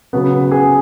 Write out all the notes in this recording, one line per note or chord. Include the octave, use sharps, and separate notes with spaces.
C#3 F#3 B3
G#4